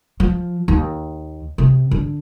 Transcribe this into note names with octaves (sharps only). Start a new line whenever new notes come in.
F3
D#2
C3
D3